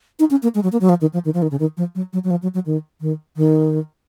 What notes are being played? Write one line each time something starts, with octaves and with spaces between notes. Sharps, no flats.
D#4
C#4
A#3
G#3
F#3
A#3
F#3
F3
D#3
F3
D#3
F3
D#3
C#3
D#3
F3
F#3
F#3
F#3
F3
F#3
F#3
D#3
D#3
D#3